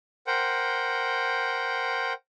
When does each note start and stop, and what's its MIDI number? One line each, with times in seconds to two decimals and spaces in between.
0.27 2.13 70
0.27 2.13 72
0.27 2.13 78
0.27 2.13 79